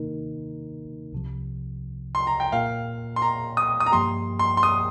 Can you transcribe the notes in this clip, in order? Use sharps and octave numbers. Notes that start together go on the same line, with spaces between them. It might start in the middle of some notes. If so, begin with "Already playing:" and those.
Already playing: C3 D#3 A#3 D#4 A#4
C2 C3 F3
C6
A#5
G5
A#2 A#3 F4 A#4 F5
C6
A#5
D#6
D#6
A#5
G2 F3 A#3 G4 C6
C6
C6
D#6